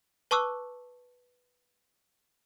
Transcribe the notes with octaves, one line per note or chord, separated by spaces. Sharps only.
B4 A5 C#6 D6 E6 F#6